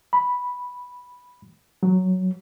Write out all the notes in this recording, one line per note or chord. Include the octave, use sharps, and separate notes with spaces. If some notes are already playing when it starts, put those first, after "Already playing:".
B5
F#3